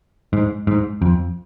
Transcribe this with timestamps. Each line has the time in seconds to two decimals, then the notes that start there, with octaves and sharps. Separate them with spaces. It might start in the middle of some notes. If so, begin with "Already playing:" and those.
0.33 G#2
0.67 G#2
1.02 F2